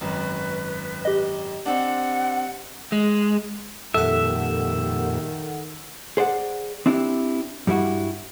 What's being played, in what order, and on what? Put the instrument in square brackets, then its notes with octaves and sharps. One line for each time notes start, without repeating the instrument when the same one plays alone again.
[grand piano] G#1 F#2 [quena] B4
[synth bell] G4 D#5
[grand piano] C4 D4 [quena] F#5
[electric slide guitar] G#3
[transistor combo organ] F2 A#2 G3 [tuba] D#3 [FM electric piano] A4 F#5 [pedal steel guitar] E5
[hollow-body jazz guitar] G#4 C5 D5 F#5
C4 D4 E4 G4
G2 G3 E4 F#4